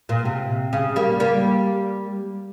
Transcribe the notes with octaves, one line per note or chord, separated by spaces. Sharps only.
A#2
C3
C#3
G3 A#3
G3 A#3